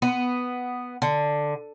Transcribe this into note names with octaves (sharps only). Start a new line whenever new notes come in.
B3
D3